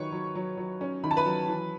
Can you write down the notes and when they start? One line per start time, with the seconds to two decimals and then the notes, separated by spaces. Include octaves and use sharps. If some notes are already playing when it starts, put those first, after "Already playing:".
Already playing: D#3 F#3 B4 C#5 C#6
0.12 F#3
0.35 F#3
0.57 F#3
0.81 C#4
1.04 D#3 B5
1.11 A5
1.17 B4 B5
1.26 F#3
1.48 E3